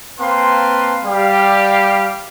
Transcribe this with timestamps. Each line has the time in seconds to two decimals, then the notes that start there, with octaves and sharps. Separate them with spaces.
0.19 A#3 C4 B4 F5 A5 C6
1.05 G3 G4 F5